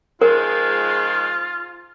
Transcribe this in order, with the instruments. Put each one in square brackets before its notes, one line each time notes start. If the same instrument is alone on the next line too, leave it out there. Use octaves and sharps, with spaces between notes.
[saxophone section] D#3 F3 G#3 [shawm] F4 [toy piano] A#4